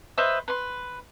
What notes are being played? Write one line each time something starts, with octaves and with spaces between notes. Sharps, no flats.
B4 C5 D#5 E5
B4 C6